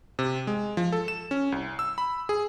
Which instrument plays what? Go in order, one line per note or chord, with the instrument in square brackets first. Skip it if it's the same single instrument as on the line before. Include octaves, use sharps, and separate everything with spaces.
[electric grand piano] C3
G#3
F3
A4
E7
C#4
C2
E6
B5
G#4